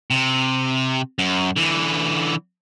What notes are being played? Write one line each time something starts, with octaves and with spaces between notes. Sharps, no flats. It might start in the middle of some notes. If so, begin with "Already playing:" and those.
C3
F#2
D3 E3